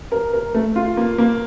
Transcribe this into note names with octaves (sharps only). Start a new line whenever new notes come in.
A#4
A#4
A3
F4
A#3
A#3